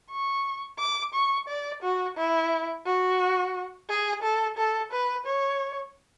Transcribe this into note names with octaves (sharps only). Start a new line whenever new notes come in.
C#6
D6
C#6
D5
F#4
E4
F#4
G#4
A4
A4
B4
C#5